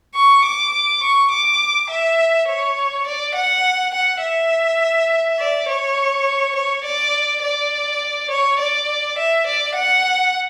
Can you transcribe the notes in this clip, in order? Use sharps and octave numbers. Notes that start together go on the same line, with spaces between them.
C#6
D6
C#6
D6
E5
C#5
D5
F#5
F#5
E5
D5
C#5
C#5
D5
D5
C#5
D5
E5
D5
F#5